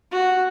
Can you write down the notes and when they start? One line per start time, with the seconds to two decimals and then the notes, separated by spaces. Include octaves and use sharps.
0.12 F#4